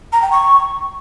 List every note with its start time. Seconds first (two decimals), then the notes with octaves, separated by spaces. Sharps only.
0.13 A#5
0.22 G5
0.32 C#6